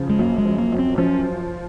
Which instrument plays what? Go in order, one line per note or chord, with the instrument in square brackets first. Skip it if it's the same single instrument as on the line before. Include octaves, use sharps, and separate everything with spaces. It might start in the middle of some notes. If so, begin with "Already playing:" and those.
Already playing: [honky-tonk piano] C#3 F3
[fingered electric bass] G#3
[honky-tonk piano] F#2 [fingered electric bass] A#3
[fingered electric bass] G#3
[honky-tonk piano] F3
[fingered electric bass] A#3
[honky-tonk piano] F#2
[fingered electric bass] C4
[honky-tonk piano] F3 [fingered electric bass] C#4